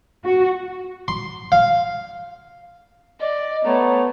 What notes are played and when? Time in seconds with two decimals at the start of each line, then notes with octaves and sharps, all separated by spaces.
0.25 F#4
1.08 C6
1.52 F5
3.20 D5 D#5
3.65 A3 B3 C#5 A#5